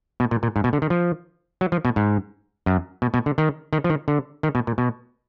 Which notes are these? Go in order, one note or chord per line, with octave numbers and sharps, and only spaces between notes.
B2
A#2
A#2
G#2
B2
D3
D#3
F3
F#3
F3
B2
G#2
F#2
B2
B2
D3
D#3
D#3
F3
D#3
D3
D#3
B2
A#2
B2